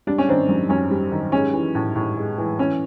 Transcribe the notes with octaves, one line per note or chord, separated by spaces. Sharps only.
G3 D4
C#4
D#3 C4 D4
F#2
F#2 C#4
G3
D#3
G#3 C#4
E3
A2
A2
G#3
E3
E3 C#4